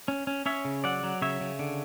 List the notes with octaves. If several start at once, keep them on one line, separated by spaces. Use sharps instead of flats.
C#4
C#4
C#4 C#5 E5
C#3
F#3 D5 F#5
F#3
C#3 C#5 E5
C#3
D3